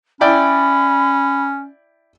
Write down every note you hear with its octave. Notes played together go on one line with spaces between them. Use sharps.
C#4 E4 D5 G5 B5